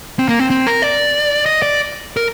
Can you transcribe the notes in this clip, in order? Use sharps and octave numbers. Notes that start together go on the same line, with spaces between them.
C4
A#3
C4
C4
A#4
D5
D#5
D5
A#4